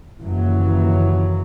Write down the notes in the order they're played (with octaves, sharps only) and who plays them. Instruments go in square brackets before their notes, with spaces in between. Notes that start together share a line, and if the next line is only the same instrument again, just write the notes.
[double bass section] F#1 D#2 C#3 E3 F#3